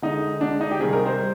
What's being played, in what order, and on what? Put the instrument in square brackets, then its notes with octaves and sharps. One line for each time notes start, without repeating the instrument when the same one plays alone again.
[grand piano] D3 G#3 D#4
D3 G#3 D4
D#4
G4
C3 D#3 G3 G#4
A#4
C5
G3